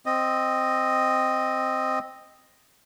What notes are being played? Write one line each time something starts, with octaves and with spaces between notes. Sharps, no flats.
C4 D#5